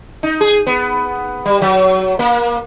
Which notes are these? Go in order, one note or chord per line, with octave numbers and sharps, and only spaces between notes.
D#4
G#4
B3
G3
F#3
A#3